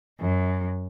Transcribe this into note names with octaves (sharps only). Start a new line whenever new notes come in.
F#2